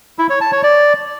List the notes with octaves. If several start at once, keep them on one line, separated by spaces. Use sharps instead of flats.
E4
C#5
A5
C#5
D5